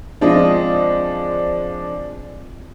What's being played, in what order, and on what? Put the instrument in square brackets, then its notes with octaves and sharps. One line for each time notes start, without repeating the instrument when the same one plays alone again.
[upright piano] F3 G#3 D4 [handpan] C4 F4 D#5